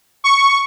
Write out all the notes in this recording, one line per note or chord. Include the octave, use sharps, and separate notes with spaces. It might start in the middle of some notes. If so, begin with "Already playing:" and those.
C#6